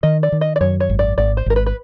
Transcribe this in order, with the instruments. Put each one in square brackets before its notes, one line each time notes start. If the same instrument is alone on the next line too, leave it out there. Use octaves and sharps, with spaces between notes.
[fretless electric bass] D#3 [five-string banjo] D#5
[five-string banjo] D5
[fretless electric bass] D#3
[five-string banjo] D#5
D5
[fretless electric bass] F#2 [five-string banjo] C#5
[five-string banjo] C#5
[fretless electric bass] G#1
[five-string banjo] D5
[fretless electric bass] G#1 [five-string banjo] D5
[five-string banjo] C5
[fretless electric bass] G#1 [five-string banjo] A#4
[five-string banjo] B4
B4